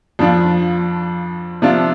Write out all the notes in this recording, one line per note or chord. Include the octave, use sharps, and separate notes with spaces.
F2 F3 D4 F4
C3 F3 D4 F4